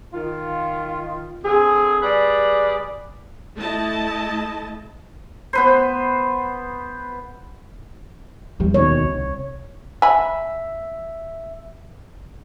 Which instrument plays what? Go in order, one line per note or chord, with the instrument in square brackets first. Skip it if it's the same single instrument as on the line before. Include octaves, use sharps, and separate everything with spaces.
[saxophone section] D#3 F4
D3 C4 G#4
G3 G#4 B4 D5
[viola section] A3 E4 D#5 A5
[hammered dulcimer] B3 B4 C5
[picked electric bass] F1 E2 G3
[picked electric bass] D#2 B2 D#3 [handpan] C#5
[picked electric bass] C2
[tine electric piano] E5 [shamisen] G#5 B5